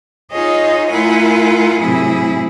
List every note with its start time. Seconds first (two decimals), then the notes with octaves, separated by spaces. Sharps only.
0.30 D#4 F4 G#4 C#5 D#5
0.90 A3 E4 F4 A#4 F#5 G#5
1.78 A2 C3 F#3 E4 G#4